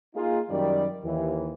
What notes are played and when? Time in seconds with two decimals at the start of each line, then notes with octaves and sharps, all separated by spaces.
0.15 A#3 D#4 F4 G#4
0.50 F#2 D#3 G3 D5
1.04 D#2 E3